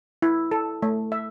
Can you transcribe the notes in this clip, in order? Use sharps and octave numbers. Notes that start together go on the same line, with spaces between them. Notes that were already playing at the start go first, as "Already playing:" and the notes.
E4
A4
A3
E5